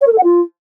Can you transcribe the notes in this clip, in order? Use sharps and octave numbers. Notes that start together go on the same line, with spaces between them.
C#5
A#4
A4
F#5
F4